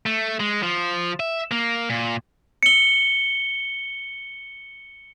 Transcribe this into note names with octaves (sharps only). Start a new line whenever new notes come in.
A3
G#3
F3
E5
A#3
A#2
C#7 G7